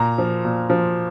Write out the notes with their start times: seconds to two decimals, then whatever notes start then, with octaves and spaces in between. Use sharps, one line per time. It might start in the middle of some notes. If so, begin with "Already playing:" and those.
Already playing: A#2 A#5
0.18 F3
0.45 A#2
0.70 F3